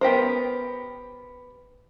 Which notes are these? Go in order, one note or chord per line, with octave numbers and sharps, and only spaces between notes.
B3 G4 A#4 C5